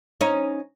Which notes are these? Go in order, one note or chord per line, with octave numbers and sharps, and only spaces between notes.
C#4 D#4